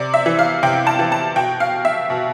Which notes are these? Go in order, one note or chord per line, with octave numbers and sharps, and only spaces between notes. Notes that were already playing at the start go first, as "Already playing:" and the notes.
Already playing: C3 D5
E5
E3
F5
C3 G5
A5
E3
A5
B2 G5
F5
E5
B2